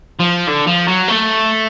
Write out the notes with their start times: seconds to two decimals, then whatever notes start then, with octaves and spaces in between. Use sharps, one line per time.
0.19 F3
0.47 D3
0.67 F3
0.88 F#3
1.08 A3